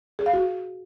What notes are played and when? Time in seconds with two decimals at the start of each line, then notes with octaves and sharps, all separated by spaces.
0.19 G#4
0.26 F5
0.33 F#4